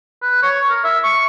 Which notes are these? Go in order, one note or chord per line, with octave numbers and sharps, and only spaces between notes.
B4
C#5
A#4
E5
C#6